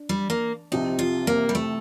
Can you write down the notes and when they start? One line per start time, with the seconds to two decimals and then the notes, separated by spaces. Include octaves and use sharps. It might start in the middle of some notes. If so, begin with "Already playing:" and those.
Already playing: D4
0.09 G3
0.30 A#3
0.72 C2 C3 F3 C4 D#4
0.99 F4
1.27 A#3
1.49 G3
1.55 A3